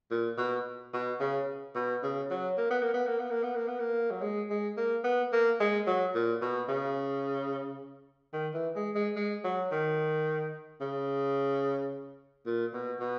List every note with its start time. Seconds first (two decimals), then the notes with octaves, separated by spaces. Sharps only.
0.11 A#2
0.38 B2
0.94 B2
1.20 C#3
1.76 B2
2.03 C#3
2.30 F#3
2.57 A#3
2.71 B3
2.82 A#3
2.94 B3
3.07 A#3
3.19 B3
3.31 A#3
3.43 B3
3.55 A#3
3.68 B3
3.80 A#3
4.11 F#3
4.22 G#3
4.50 G#3
4.77 A#3
5.04 B3
5.33 A#3
5.60 G#3
5.87 F#3
6.15 A#2
6.42 B2
6.69 C#3
8.33 D#3
8.54 E3
8.76 G#3
8.95 G#3
9.16 G#3
9.44 F#3
9.72 D#3
10.81 C#3
12.46 A#2
12.74 B2
13.00 B2